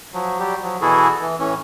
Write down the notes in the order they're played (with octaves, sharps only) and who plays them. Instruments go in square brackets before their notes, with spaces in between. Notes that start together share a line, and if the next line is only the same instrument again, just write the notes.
[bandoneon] F3 F#3
F#3 G3 G4
F3 F#3
B2 E3 E4 F#4 G#4 A4
E3
A2 E3 C#4